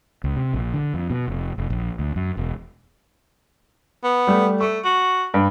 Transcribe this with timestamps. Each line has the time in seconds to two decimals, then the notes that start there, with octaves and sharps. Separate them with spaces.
0.24 C#2
0.36 C3
0.54 A#1
0.74 D3
0.94 F2
1.10 B2
1.28 F1
1.58 F1
1.70 A#1
1.99 D2
2.16 F#2
2.37 E1
4.04 B3
4.27 G3 A3
4.61 A3 C#6
4.85 F#4
5.34 G2